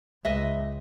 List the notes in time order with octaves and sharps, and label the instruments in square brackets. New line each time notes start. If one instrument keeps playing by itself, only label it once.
[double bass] C#2 [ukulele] B4 D#5 E5